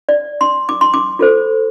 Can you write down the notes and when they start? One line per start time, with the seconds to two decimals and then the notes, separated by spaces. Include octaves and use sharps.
0.09 D5
0.41 C6
0.69 D6
0.81 C6
0.94 D6
1.19 F4 A4 C5